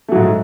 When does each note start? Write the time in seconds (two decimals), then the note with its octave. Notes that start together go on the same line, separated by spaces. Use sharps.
0.08 A3
0.12 F#3
0.15 G#2